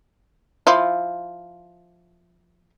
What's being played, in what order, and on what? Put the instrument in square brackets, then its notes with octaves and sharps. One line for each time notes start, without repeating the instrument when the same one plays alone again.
[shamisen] F3 E4 F4